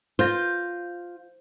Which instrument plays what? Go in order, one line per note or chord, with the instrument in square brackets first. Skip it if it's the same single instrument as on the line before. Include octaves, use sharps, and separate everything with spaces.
[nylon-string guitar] F4 [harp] C5 G6 A#6